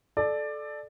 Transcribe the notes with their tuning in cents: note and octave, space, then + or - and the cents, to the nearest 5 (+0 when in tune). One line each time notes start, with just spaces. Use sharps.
A4 -20 D5 +15